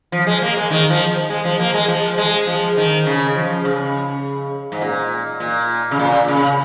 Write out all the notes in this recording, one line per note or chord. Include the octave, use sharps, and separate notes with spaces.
F3
G#3
A#3
G#3
D#3
F3
G#3
F3
A#3
G#3
F3
G#3
F3
D#3
C#3
F3
C#3
G#2
A#2
A#2
C#3
A#2
C#3